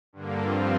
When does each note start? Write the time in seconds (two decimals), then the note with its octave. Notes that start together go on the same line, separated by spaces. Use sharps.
0.13 G2 D3 A#3
0.41 G2 F3 C4 F4